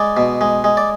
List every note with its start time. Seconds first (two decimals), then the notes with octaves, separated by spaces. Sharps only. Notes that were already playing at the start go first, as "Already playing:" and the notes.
Already playing: G#3 D5
0.17 B2
0.41 G#3
0.64 G#3
0.77 D5